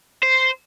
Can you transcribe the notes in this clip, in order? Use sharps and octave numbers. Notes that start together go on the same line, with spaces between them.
C5